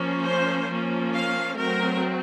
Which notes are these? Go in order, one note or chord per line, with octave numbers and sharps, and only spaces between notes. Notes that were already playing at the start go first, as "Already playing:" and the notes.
Already playing: F3 A#3 C#4
C5
F3 A#3 C#4
F5
F#3 A3 C4 A#4